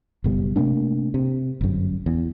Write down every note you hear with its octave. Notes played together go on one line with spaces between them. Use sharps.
F#1 B2 G3
C3 A3 A#3 D4
C3
G1 F#2
E2